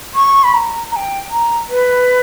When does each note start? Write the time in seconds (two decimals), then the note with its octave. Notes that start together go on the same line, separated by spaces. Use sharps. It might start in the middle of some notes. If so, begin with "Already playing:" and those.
0.15 C#6
0.44 B5
0.54 A#5
0.91 A#5
0.96 G5
1.30 A#5
1.70 B4